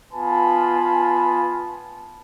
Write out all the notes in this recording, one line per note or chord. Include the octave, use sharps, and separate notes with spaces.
B3 F4 B4 G#5 A5 B5